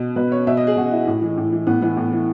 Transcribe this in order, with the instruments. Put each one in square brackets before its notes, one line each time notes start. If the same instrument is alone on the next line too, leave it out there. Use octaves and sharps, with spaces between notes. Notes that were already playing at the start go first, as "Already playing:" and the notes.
Already playing: [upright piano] B2
B2 B4
C#5
B2 E5
D#5
G#4
B2 F#4
E4
A2
E3
A2
E3
A2 B3
E3 B3
A2
E3